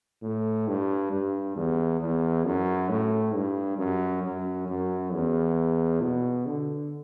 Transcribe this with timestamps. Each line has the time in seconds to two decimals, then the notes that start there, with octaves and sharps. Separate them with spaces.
0.22 A2
0.68 G2
1.12 G2
1.56 E2
2.01 E2
2.46 F#2
2.89 A2
3.34 G2
3.78 F#2
4.23 F#2
4.68 F#2
5.13 E2
6.02 B2
6.46 D3